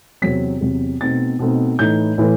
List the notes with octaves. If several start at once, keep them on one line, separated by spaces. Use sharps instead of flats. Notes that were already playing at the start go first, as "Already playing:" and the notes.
E2 C3 F#3 C4 B6
E2 C3 F#3 C4
B2 A3 C4 D#4 A6
B2 A3 C4 D#4
A2 E3 A3 D#4 G6
A2 E3 A3